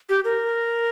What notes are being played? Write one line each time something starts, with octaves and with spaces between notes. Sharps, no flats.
G4
A#4